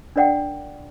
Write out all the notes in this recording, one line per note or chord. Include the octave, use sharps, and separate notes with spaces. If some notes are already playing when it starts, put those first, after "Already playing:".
D4 A#4 D5 F#5 G5